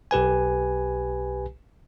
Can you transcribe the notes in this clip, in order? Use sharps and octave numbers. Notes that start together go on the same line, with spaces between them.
B1 G4 B4 G#5